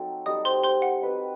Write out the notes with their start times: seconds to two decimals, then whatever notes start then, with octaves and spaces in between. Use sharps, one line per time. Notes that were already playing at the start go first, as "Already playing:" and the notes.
Already playing: F#3 C4 D#4 A4
0.26 G3 D#4 A4 D#5 D#6
0.45 C5 C6
0.64 C5 C6
0.82 F#5
1.01 C4 F#4 B4 D#5